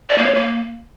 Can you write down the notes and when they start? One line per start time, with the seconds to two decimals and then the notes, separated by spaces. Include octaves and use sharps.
0.10 D5
0.18 A#3
0.26 C#5
0.35 A#3